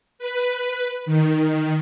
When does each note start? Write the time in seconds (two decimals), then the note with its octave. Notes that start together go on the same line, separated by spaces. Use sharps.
0.19 B4
1.06 D#3